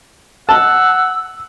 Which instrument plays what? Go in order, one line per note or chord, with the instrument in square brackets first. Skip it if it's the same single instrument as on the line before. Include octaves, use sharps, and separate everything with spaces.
[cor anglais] F#5 [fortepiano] A5 [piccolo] E6